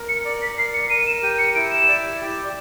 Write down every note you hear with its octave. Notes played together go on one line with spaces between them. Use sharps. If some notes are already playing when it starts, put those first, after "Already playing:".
Already playing: A#4
C#7
D5
B6
A#4 C7
C#7
A#4 D#7
E7
G4 D#7
C#7
E4 D7
E7
D5
G4